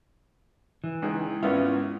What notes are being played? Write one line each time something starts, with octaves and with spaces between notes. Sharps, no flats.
E3
C#2 D#4 G#4
G#1 B3 C#4 E4 F4